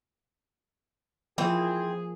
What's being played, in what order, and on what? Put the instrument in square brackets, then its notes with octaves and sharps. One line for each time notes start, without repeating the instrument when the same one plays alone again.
[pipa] E3 C4 [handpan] F3 A#3 F4 [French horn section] G#4